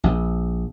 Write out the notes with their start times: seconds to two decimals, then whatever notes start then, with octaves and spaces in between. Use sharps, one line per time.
0.04 A#1